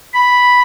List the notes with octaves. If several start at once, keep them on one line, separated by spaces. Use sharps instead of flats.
B5